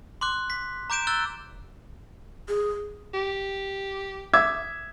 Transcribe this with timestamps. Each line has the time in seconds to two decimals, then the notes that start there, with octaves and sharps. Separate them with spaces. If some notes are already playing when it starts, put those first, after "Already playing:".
0.21 C6 D6 F#6
0.50 B6
0.90 A#5 D6 G6 D7 E7
1.07 E6 F#6 A6 G7
2.48 G#4
3.14 G4
4.34 E5 D6 G#6